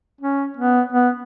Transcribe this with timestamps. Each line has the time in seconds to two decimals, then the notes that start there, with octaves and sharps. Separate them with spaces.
0.21 C#4
0.57 B3
0.93 B3